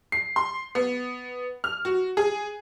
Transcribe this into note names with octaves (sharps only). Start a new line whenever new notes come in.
C7
C6
B3
F6
F#4
G#4